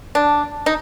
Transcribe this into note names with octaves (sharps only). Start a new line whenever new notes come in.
D4
D#4